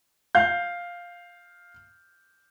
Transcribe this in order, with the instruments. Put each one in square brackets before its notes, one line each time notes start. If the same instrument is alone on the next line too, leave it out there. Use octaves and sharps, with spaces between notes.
[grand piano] F5 G6